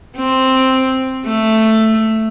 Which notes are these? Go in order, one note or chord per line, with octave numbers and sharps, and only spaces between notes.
C4
A3